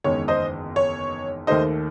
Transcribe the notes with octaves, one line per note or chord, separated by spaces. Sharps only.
F#1 E2 D#3 G#3 C#5
C5 D#5
C#5
D#2 D#3 A3 D#4 C5 D#5